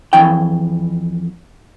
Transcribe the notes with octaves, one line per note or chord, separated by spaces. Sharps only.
F2 E3 E4 G5